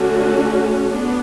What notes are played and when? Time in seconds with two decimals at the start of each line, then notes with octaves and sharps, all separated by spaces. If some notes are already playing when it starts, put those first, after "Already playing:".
Already playing: D3 A3 C#4 F#4
0.91 B3 D4